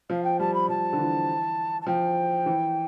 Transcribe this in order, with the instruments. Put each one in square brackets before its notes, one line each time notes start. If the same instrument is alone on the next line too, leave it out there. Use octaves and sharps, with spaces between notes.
[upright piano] F3 [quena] F5
[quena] G5
[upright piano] G3 [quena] A5
[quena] B5
[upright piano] F3 [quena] A5
[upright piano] D3
E3
[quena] A5
[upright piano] F3 [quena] G5
[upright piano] E3